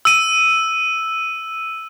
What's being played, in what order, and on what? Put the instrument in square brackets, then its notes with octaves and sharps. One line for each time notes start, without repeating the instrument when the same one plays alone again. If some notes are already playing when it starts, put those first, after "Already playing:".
[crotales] E6 D#7